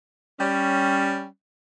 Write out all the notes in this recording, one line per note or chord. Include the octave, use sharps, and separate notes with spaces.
G3 C#4